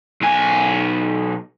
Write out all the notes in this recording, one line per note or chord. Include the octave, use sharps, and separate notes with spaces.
B1 G#5